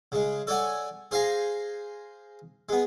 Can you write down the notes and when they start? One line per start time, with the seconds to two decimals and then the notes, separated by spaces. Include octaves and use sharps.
0.12 C#3 G#3
0.47 A4 C#5 D5 F#5 G#5
1.11 G#4 C5 F5 G#5 A#5
2.69 G#3 B3